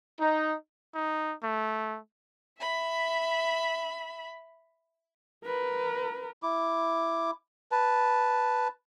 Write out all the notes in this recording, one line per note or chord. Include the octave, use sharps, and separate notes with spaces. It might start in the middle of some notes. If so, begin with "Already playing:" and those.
D#4
D#4
A3
E5 B5
A#4 B4
E4 D6
B4 A5